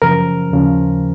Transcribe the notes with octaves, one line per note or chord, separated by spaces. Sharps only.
F#2 C#3 F3 A#4
D#2 C#3 F3